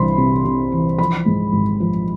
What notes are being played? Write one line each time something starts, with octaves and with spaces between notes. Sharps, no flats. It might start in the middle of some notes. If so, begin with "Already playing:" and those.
Already playing: C2 E3 C5 B5 C6
C3
C3
E3
F3 B5
G#2
G#1
F3